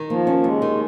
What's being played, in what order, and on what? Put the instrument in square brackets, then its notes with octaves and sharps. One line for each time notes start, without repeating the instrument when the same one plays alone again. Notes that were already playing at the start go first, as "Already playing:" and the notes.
Already playing: [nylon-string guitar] D#3
[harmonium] F3 [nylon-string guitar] A#3
[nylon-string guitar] C#4
[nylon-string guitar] D#2 [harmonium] G#3
[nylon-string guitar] D#3